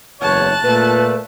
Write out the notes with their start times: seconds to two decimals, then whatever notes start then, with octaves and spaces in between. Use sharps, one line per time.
0.21 F#1 E2 C#5 A5 F#6
0.64 A#2 A3 B4